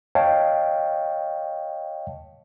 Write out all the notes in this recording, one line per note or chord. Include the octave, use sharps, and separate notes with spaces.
C#5 D#5 F5 G5 A5